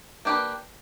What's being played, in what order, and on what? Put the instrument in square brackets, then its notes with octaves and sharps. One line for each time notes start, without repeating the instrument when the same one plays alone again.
[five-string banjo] A#3 D4 G4 B4